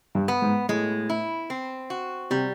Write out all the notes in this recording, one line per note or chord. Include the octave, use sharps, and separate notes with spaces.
G2
B3
G#2
A2 G#3
E4
C4
F#4
C3 G3